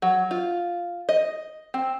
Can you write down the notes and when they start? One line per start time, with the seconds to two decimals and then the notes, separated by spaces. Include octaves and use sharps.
0.02 F#3
0.31 F4
1.09 D#5
1.74 C4